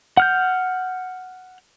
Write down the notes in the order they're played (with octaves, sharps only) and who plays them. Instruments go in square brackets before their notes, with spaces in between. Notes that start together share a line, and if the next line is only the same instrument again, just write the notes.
[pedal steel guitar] F#5 F6 G6